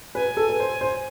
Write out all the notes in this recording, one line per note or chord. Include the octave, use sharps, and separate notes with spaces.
B4 G#5
A4
B4
C5
C5